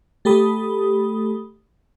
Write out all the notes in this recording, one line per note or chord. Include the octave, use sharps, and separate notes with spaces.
A3 G4 A4 B5 D#6